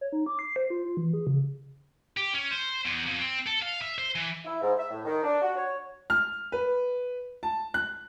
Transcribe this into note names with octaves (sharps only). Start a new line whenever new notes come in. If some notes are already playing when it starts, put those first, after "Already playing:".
C#5
D#4
D6
C7
C5
F4
F4
E3
G#4
C#3
G4
C#4
C5
E2
F2
C4
A4
F5
E5
C5
E3
E4
G#2
E5
A2
D#3
D4
F#4
C#5
F6
B4
A5
F#6